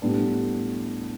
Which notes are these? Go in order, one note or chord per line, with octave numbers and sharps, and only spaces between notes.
A2 G3 B3 D4